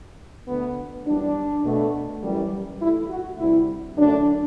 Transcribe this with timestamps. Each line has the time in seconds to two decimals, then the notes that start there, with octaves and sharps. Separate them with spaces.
0.47 D2 D3 A3 B3
1.06 F#2 E3 G3 D4
1.64 B2 A3
2.23 F#2 E3 G3
2.80 G2 E3 A3 E4
3.10 F#4
3.38 D2 C3 G3 E4
3.97 F#2 D3 A3 D4